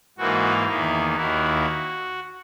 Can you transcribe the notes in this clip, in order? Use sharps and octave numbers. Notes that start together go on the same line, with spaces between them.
G#2 E3 A#3 D#4 F#4
E2 D#3 A#3 D#4 E4
D#2 D#3 A#3 E4 F#4